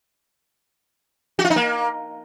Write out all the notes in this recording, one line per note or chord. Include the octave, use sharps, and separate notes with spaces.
F#4
F4
D#4
A#3